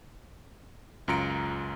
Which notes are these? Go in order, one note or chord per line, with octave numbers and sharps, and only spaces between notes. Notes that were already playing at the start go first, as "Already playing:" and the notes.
C#2 F#2 F4 A#5 C#7 D7